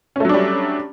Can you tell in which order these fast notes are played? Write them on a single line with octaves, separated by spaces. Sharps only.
C#4 A3 F#3 D4 G3